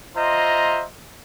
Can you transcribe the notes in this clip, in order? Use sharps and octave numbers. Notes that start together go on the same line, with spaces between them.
F4 C5 D#5 E5 A#5